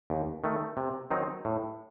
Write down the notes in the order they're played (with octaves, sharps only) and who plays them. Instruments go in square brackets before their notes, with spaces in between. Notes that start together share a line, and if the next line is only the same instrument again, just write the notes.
[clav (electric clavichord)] D#2
D#3 A3
C3
D#3 F#3 C4 D#4
A2